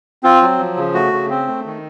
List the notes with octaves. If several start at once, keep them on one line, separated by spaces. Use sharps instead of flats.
C4 F4
F#3
F3
C#3
A3 F#4
C#3
C4
A3
D#3